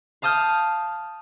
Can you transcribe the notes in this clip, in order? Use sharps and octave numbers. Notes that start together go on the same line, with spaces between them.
F5 A5 D#6 F6 G6